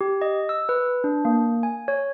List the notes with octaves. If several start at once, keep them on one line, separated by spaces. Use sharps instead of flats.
G4
D#5
E6
B4
D4
A#3
G#5
C#5